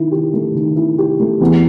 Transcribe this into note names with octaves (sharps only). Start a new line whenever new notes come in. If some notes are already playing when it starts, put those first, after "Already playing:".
Already playing: D#3 E4
G4
A3
D#3
E4
G4
A3
E2